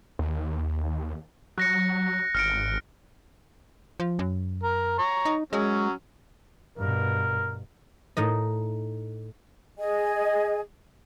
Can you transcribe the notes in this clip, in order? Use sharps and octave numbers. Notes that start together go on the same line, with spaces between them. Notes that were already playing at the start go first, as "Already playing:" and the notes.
D#2
F#3 F#6 A#6 C#7
G#1 F6 C#7 D7
F3
F#2
A#4
C#5 A#5 C#6
D#4
F#3 G#3 C#4
G2 B2 A#4
A2 D#4 D#5
G#4 D#5 G#5